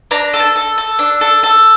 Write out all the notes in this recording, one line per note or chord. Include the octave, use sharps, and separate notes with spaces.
D4 A#5
A4
A5
A4
A4
D4
A4
A4